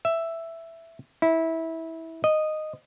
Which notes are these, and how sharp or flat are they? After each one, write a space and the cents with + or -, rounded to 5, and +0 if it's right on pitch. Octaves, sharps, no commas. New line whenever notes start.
E5 +5
E4 -20
D#5 -10